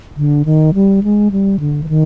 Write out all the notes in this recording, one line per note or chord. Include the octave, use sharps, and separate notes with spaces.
D3
D#3
G3
G#3
G3
D3
E3
D#3